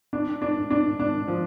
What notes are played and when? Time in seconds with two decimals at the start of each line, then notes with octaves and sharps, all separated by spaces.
0.13 D4
0.42 D4
0.70 D4
1.00 D4
1.28 F3